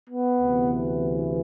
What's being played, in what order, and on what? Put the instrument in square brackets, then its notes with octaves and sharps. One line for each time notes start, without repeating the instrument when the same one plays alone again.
[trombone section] B3
D2 C3 E3